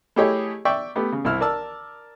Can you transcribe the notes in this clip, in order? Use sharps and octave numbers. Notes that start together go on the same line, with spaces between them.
A3 E4 G4 G#4 C#5 D#5
D5 E5 G5 C#6
A3 B3 G4
C#3
C2 E4 E6 F6
A#4 D5 A5 E6